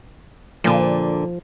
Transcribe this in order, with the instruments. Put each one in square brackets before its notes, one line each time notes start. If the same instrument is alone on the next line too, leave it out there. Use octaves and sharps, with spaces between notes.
[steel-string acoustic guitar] A#2 D3 [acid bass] F3